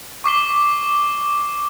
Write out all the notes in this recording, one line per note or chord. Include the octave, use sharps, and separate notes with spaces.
C#6 D6 C7 G7